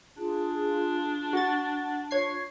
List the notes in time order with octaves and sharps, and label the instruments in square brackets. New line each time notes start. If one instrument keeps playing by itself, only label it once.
[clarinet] D4 [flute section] F4 G#4
[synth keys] F#4 A6
[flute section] F4 [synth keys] C#5 G#6 C7